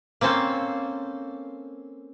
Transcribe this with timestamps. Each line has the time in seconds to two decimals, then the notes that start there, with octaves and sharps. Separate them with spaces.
0.21 A#3 C4 C#4 A4 C5